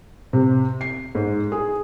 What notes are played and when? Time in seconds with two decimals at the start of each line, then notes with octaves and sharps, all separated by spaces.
0.33 C3
0.81 C7
1.15 G#2
1.52 G#4